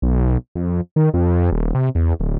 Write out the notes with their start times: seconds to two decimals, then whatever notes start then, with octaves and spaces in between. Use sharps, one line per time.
0.02 B1
0.55 F2
0.96 D#3
1.14 F2
1.52 D#1
1.75 C3
1.95 E2
2.20 D1